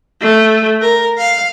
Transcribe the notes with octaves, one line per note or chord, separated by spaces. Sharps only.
A3
A#4
F5